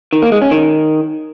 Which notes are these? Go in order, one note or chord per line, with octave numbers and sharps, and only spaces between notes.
D#3
A#3
G#3
C#4
D#3